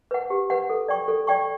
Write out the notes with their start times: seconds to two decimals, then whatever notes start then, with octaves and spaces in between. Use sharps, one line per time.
0.11 B4 F#5
0.30 G4
0.50 B4 F#5
0.70 A4
0.88 D5 G5 C#6
1.08 A4
1.27 D5 G5 C#6